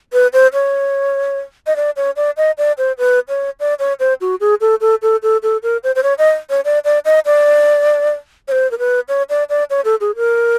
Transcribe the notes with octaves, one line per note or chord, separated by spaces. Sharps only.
B4
C5
C#5
D#5
D5
C#5
D5
D#5
D5
C5
B4
C#5
D5
C#5
C5
F#4
G#4
A4
A4
A4
A4
A4
A#4
C5
C5
C#5
D#5
C#5
D5
D5
D#5
D5
C#5
C5
A#4
B4
C#5
D5
D5
C#5
A4
G#4
A#4